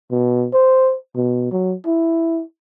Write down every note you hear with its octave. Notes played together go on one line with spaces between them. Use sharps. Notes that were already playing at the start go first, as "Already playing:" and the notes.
B2
C5
B2
F#3
E4